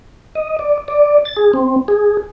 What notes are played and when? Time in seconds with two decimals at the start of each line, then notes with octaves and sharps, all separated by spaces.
0.35 D#5
0.59 D5
0.88 D5
1.25 A6
1.36 G#4
1.54 C4
1.88 G#4